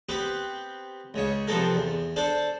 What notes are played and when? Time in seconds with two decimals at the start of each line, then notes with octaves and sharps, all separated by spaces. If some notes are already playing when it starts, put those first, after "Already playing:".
0.09 B3 C4 G4 B4
1.14 C#2 C#3 C#5
1.47 C3 F3 B3 C4 A4 A#4
1.75 E2
2.16 D4 A4 C5 D5